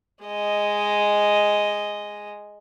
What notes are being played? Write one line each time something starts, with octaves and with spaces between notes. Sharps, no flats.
G#3 D#5